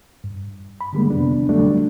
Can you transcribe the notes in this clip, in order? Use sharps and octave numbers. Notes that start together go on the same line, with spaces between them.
G2
B5
D3 D#3 G3 G#3 A#3
F2 C3 B3 D4
D3 F#3 G3 A3 D4